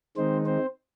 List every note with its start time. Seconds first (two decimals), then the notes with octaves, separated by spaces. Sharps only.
0.17 D#3 G#3 C4 D#4 C5
0.46 C4 C5